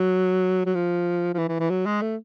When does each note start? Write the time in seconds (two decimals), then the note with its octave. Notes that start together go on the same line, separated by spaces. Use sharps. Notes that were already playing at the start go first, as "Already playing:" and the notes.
Already playing: F#3
0.66 F#3
0.75 F3
1.34 F3
1.38 E3
1.49 E3
1.60 E3
1.70 F#3
1.86 G#3
2.02 A3